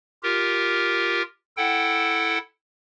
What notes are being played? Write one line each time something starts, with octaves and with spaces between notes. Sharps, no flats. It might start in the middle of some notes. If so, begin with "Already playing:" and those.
F4 G4 A#4
E4 A4 F#5 G5